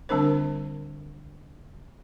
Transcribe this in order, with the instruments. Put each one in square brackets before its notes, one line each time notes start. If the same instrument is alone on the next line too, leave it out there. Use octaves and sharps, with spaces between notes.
[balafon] D3 G3 C4 D4 A#4 C5